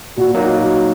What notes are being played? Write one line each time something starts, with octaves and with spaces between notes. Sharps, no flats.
A#2 F#4
F#3 A#3 D#4